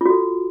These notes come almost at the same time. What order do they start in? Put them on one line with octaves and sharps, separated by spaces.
F4 F#4 A4